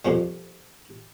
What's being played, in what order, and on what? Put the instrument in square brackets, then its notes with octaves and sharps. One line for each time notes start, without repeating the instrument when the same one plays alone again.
[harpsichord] F2 A#2 F3 G3